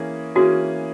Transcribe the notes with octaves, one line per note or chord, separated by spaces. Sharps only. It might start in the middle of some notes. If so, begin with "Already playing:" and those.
Already playing: E3 A#3 C#4 G#4
E3 A#3 C#4 F#4 G#4